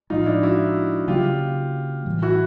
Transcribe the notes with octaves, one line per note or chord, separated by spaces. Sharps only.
A2 F3 G#3 D#4 F4
D4 E4
E4 F#4
C#3 F#3 A#3 C#4 F4 G4
A2 E3 G3
E4 F#4